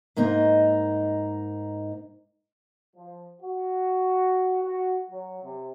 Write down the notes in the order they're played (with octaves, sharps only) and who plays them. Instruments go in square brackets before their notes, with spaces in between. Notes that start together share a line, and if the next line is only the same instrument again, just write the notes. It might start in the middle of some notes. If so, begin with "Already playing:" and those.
[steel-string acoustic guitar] G#2 A#3 D#4
[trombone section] F3
F#4
F#4
F#3
C3